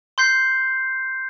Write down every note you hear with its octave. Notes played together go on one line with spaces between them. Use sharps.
C6 G6 C7